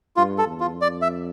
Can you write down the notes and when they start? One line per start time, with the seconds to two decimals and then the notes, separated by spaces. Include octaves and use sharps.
0.17 G2 F4
0.38 A4
0.46 E2
0.60 F4
0.74 F2
0.81 D5
1.02 E5